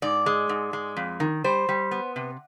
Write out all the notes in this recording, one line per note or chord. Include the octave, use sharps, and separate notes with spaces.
G#2 D5
G#3
G#2
G#3
F2
D#3
G3 C5
G3
B3
C3